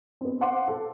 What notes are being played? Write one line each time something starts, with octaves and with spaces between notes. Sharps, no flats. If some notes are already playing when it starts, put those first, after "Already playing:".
B3 C4
C5 F5 F#5 C6 D6
A4